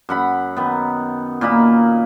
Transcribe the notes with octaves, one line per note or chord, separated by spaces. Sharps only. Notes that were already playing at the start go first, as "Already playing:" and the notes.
F#2 F#5 B5
D#3 B3
A#2 A#3 D#4 B5